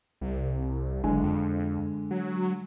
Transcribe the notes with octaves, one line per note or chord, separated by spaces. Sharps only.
C2
F#1 D3 G#3 G#5
F2
F#3